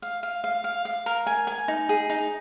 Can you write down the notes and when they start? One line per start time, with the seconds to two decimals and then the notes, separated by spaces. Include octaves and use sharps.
0.02 F5
0.23 F5
0.44 F5
0.64 F5
0.85 F5
1.06 A#4
1.27 G#5
1.47 G#5
1.68 D#4
1.89 G#4
2.10 D#4